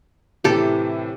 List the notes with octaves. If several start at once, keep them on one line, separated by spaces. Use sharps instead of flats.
A2 C3 E3 G4 A4